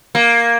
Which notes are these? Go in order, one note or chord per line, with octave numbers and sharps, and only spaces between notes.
A#3